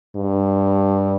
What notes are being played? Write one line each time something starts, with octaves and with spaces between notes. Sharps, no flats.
G2